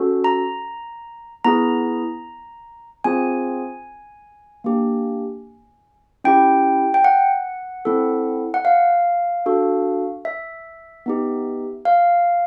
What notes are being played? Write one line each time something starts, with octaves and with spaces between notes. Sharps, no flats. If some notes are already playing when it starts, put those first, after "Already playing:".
Already playing: C#4 F#4 A4
A#5
B3 E4 G#4 A#5
C4 F4 G#4 G#5
A#3 D4 G4
C#4 E4 G4 G5
G5
F#5
C4 E4 A4
F#5
F5
D4 F#4 A4
E5
B3 D#4 G4
F5